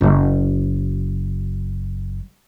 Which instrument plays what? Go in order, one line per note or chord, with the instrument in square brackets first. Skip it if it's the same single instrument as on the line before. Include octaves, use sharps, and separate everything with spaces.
[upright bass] F#1 F#3